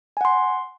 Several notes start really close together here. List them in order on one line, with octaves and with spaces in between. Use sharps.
G#5 F#5 C6